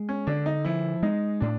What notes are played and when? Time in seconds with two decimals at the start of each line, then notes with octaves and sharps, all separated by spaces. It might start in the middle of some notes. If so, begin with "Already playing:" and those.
Already playing: G#3
0.09 C#4
0.27 D3 D4
0.46 D#4
0.65 F3 E4
1.02 G#3 D#4
1.40 A2 D4